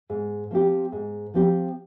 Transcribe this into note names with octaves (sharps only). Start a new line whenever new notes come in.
G#2
F3 C4 G4
G#2
F3 C4 G4